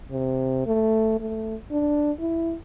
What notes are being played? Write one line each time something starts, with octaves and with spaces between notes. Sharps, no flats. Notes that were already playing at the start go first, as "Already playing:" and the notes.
C3
A3
A3
D4
E4